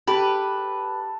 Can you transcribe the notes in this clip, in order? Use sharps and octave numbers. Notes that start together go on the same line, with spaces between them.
G4 A4 B4